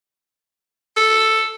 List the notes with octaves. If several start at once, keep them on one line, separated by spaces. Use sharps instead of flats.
A4